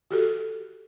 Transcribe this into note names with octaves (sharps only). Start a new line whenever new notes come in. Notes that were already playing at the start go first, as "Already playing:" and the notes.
F#4 G4 A4